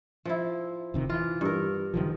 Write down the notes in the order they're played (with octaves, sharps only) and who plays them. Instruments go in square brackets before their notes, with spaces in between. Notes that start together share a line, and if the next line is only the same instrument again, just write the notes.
[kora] F3 E4
[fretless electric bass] E1 C3 D#3
[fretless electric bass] E3 [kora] F4
[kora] G2 A#4
[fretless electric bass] F#1 D#3 F3